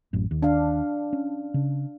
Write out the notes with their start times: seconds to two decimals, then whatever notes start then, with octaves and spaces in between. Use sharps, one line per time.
0.13 A1 F#2
0.31 D#2
0.43 D4 F5
1.13 C#4
1.54 C#3